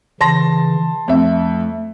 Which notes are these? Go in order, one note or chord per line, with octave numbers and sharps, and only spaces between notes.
C#3 E3 A5 C6 A#6
F2 A3 E5